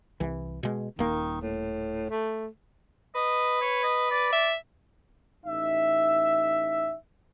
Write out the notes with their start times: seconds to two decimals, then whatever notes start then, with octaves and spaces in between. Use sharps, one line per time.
0.20 C2 E3
0.63 B2 G#3
0.99 D#1 D#3 A#3
1.41 A2
2.10 A3
3.15 B4 D#5
3.61 C#5
3.83 D#5
4.11 D5
4.33 E5
5.46 A1 D#4 E5